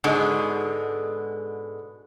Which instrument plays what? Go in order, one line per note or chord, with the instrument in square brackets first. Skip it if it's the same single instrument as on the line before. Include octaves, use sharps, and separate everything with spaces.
[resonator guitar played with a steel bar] G#2 B2 D3 G#3